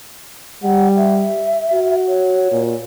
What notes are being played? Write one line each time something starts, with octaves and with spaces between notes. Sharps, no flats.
G3 F#5
E5
F#4
C#5
A#2